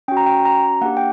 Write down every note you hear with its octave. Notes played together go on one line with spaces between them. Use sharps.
C#4 F#4 G5
A#5
G5
A#5
A#3 D4 G4 F#5
G5